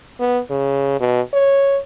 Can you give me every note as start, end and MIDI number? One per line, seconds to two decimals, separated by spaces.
0.20 0.39 59
0.50 0.99 49
1.00 1.21 47
1.33 1.79 73